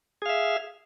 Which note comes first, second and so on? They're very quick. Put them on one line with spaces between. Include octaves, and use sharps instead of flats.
G#4 F5 E5